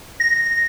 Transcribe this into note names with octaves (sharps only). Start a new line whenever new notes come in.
A#6